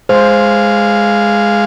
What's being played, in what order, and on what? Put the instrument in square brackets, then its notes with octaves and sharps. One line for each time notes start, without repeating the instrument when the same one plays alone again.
[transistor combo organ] G#3 F5 [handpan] C5